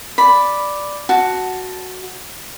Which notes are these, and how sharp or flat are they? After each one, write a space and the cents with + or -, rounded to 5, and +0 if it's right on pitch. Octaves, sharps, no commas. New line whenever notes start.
D5 +0 B5 +0
F#4 +0 A5 +0